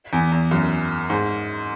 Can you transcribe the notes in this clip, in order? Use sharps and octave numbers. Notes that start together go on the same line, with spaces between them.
E2
E2
F#2
G#2